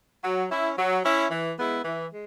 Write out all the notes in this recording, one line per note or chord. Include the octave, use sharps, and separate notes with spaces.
F#3
C#4 E4
F#3
C#4 E4
E3
G#3 B3 E4
E3
G#3